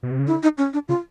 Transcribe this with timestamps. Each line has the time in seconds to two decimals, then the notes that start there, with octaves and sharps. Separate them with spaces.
0.03 B2
0.11 C3
0.19 C#3
0.27 D3 E4
0.43 D#4
0.58 C#4
0.73 D4
0.88 C#3 F4